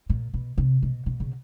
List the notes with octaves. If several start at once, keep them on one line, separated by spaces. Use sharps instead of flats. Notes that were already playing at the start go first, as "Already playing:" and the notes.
A#2
B2
C3
B2
B2
C#3